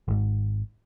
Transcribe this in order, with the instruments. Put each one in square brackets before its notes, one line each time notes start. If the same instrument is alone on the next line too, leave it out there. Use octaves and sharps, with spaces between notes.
[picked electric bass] G#1 G#2